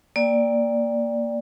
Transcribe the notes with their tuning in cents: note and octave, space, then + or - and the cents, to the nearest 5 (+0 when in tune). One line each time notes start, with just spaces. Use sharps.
A#3 +0 D5 +0 G5 +15